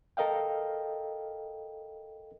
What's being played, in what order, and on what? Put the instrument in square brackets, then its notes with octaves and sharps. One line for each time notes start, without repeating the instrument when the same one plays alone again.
[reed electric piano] A4 A#4 D#5 F5 G5